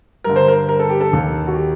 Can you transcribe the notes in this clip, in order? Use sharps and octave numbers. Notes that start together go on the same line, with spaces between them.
G2 D3 A#4
C5
A#4
A#4
A4
G4
A4
D#2 D#3
F#4
G4